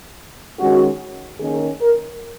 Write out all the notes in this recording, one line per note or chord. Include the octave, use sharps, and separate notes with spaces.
D#3 G#3 C#4 F#4
D#3 A#3 C#4 G#4
A#4